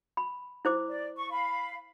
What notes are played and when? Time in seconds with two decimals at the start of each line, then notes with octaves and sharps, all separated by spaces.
0.17 B5
0.65 E4 C5 D6
0.89 D5
1.16 C#6
1.30 F5 B5